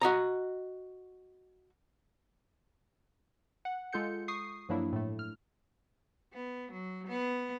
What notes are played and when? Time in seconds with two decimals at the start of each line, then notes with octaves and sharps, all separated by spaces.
0.01 F#4 D#5 A#5
3.65 F#5
3.93 G#3 F4 A4 G6 C#7
4.28 C#6 D#6 C7
4.69 G2 F3 F#3 A#3 D4 E4
4.92 A2 A3
5.19 F6
6.33 B3
6.72 F#3
7.08 B3